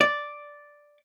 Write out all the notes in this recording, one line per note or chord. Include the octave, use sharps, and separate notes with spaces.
D5